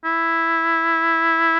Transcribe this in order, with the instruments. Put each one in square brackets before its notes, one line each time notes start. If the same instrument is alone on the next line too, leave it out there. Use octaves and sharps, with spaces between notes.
[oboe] E4